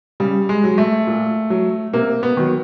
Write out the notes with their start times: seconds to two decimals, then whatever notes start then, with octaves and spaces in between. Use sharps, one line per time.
0.20 C#3 G3
0.49 G#3
0.64 F#3
0.78 A3
1.07 A#2
1.50 F#3
1.93 C3 A#3
2.23 B3
2.37 D#3 F#3